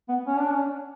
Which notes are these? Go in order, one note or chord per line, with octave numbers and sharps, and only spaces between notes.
B3
C#4
D4
C#4